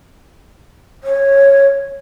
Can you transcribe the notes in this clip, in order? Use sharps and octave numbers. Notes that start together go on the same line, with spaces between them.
C#5